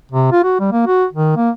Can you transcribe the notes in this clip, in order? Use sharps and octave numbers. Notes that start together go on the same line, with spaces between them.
C3
F4
F#4
G3
A#3
F#4
D#3
A#3